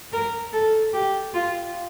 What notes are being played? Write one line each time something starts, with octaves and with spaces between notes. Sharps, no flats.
A#4
A4
G4
F4